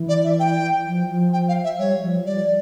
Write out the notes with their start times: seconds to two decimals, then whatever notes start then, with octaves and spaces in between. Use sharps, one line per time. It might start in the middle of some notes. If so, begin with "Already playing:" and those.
Already playing: E3
0.09 D5
0.24 E5
0.40 G5
0.86 F3
1.10 F3
1.33 G5
1.48 F5
1.64 E5
1.79 G3 C#5
2.02 F3
2.26 G3 D5